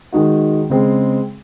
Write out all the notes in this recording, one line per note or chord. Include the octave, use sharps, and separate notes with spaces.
D#3 G#3 D#4 F#4
C#3 G#3 C4